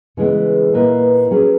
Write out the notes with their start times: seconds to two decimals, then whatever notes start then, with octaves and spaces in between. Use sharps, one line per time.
0.17 C#3 E3 G#3 B3
0.74 A#2 A#3 E4 B4 D#5
1.31 F#3 C#4 G#4 B4